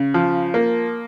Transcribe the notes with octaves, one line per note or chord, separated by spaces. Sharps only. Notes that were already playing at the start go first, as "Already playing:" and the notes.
Already playing: C#3
F3
A#3